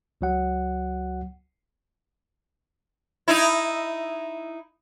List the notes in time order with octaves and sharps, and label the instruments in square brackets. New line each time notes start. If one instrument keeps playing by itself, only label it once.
[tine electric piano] C#2 F#3 F#5
[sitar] D#4 E4